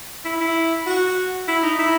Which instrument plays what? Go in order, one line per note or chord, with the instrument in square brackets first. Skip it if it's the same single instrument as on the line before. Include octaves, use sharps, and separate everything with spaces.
[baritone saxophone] E4
E4
F#4
E4
D#4
E4